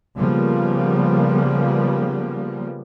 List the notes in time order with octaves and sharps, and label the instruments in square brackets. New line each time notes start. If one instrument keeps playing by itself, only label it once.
[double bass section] C#3 F3 G3 A#3 B3